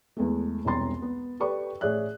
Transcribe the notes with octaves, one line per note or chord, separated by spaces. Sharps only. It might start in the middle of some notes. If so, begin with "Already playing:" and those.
E2 G#3 A3
E1 C2 C#4 A#5 C6 A6
B3
G4 A4 B4 D5 G5 C#6
A1 G#4 C#5 D5 E5 F#6